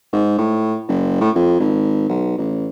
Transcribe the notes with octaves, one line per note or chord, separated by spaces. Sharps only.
G#2
A2
F#1
A2
F2
G#1
B1
A1